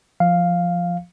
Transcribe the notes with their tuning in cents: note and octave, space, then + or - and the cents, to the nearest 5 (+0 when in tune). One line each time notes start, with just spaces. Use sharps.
F3 +0 F5 +0